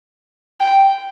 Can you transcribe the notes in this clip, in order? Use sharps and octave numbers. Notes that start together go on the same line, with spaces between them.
G5